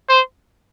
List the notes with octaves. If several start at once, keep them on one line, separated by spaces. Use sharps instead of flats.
C5